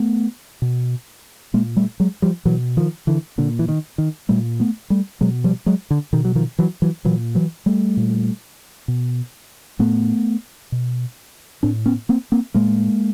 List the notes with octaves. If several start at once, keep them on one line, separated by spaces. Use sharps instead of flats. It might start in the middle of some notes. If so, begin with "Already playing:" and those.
Already playing: A3 B3
B2
A#2 G#3 A#3
G3 A3
F#3 G#3
F3 G3
B2 E3 F#3
D#3 F3
D3 E3
A#2 D3
E3
D#3
D#3
A#2 G3 A3
A3 B3
G3 A3
B2 F#3 G#3
F3 G3
F#3 G#3
D3
B2 D#3
F#3
D#3 F3
E3 F#3
E3 F#3
A#2 E3 F#3
E3 F#3
G3 A3
A#2
B2
A2 A3 B3
B2
A2 C4 D4
B3 C#4
A#3 C4
A#3 C4
A2 G#3 A#3